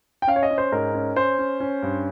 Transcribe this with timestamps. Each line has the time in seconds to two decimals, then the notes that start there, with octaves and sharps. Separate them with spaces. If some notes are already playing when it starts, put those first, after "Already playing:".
0.22 G5
0.27 C#4 F5
0.36 C#5
0.43 D#5
0.51 C#4
0.58 C5
0.72 G#2 A#4
0.94 C#4
1.16 C#4 C5
1.39 C#4
1.60 C#4
1.83 G2